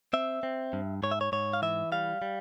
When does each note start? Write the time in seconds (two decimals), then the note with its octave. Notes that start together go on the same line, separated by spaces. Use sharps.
0.13 C4 E5
0.43 C4
0.73 G2
1.03 G#2 C#5
1.11 E5
1.21 C#5
1.32 G#2 C#5
1.53 F5
1.62 E3 E5
1.92 G3 F5
2.22 G3